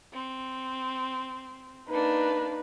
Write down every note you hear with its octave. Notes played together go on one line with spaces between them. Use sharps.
C4
A#3 D4 D#4 B4